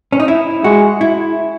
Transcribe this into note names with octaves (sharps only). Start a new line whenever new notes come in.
C#4
D#4
E4
G#3 F#4
E4